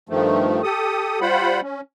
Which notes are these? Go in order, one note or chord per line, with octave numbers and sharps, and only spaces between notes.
G2 D#3 F3 A3
G4 A4 D#6
G3 F4 C5 F#5 B5
C#4